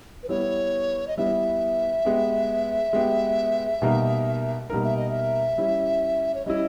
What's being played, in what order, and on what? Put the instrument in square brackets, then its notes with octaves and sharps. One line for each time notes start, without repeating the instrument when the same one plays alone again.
[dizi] B4
[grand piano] G3 B3 E4 [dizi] C#5
[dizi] D#5
[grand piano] G3 B3 E4 [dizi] E5
[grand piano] G#3 B3 G4
G#3 B3 G4
B2 G3 A#3 D#4 A#4
B2 G3 A#3 D#4 A#4
[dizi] E5
D#5
E5
[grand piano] G3 C#4 E4
[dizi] C#5
[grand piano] G3 C#4 E4 [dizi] D#5